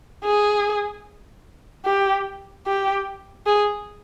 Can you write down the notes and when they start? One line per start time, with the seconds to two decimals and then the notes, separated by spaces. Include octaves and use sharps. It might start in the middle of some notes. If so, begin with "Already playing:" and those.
0.24 G#4
1.85 G4
2.67 G4
3.46 G#4